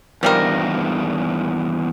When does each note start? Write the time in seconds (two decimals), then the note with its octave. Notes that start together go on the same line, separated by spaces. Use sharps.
0.23 E2 G2 D#3 F3 G3 A#4